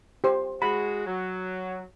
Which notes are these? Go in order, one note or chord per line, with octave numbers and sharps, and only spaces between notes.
G4 C5
G#3 F#4 B5
F#3